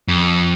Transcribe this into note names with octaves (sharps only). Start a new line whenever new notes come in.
F2